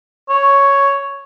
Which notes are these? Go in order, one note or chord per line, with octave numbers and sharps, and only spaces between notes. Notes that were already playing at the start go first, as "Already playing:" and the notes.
C#5